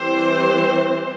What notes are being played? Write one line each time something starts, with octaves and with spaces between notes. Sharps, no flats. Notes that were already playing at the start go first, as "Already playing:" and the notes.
Already playing: E3 G3 C4 C5